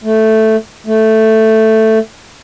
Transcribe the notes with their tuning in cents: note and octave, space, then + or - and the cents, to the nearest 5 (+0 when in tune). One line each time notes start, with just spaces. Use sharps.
A3 +0
A3 +5